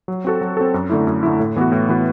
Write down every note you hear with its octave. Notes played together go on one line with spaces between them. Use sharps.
F#3
C4 F#4 A4
F#3
C4 F#4 A4
F#2
D3 A3 E4
F#2
D3 A3 E4
A2
E3 B3 F#4
A2
E3 B3 F#4